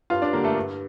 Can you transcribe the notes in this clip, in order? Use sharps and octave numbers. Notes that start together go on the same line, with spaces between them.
G2 F4 F5
D4 D5
D3 G3 A#3 A#4
A3 A4
G2